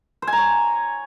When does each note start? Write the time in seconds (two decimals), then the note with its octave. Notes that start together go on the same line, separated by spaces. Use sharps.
0.22 C5
0.27 G#5
0.33 A#5
0.38 C#5